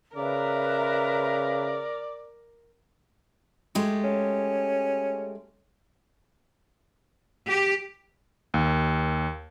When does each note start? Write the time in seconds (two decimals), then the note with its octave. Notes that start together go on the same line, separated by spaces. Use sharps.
0.16 C#3 A#4 B4 D5 E5 A#5
3.75 G#3 A3 G4
4.04 C#4
7.48 G4
8.54 D#2